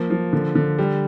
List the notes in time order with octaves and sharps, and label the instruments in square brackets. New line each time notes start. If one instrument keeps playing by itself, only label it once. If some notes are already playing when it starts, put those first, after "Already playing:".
Already playing: [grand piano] F3 A#3
F3
D3
D3
G3